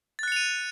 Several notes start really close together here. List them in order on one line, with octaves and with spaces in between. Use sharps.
A6 F#6 C#7 F7 D#7